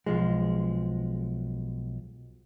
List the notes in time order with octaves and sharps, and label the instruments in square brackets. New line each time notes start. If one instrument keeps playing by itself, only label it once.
[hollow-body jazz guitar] B1 F3 G#3